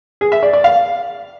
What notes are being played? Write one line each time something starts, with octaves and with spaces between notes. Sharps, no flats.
G#4
E5
D5
D5
F5